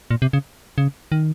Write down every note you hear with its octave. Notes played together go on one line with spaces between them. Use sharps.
A#2
C3
C#3
C#3
D#3